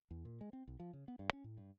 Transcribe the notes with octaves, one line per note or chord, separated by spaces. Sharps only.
E2
A#2
G#3
C4
B1
F3
C#3
B3
G2
C#4
A2
G2